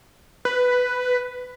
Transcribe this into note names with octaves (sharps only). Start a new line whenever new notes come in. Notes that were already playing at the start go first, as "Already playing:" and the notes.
B4